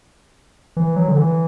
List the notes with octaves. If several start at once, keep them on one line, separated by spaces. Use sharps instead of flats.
E3
F#3
D3
E3